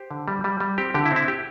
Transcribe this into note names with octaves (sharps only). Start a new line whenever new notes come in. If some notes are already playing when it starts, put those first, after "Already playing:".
Already playing: G4 C5
D3
G3
G3
G3
C4 G4
D3 G4
E4
C4
E4
G4